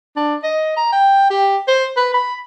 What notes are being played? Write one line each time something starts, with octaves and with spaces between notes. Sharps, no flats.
D4
D#5
A#5
G5
G4
C5
B4
B5